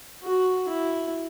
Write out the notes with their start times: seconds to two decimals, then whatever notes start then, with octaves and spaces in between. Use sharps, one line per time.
0.23 F#4
0.69 E4